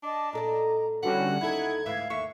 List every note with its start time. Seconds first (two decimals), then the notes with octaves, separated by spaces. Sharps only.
0.03 D4 D#5 A5 D6
0.33 A#2 A4 D5 D#5 A#5
1.03 D3 E3 G3 C#4 F#4 F#5
1.41 D#2 D#4 E4 F#4 A4 B5 G#6
1.86 D2 G#2 E3 E5 F5
2.10 D#2 D3 E5 C#6